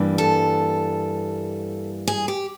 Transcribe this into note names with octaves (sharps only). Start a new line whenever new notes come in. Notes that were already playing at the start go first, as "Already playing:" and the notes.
Already playing: G2 E3 G3 A#3
A4
G#4
G4